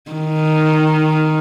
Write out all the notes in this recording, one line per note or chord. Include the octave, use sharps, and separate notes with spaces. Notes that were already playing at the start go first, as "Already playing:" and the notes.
D#3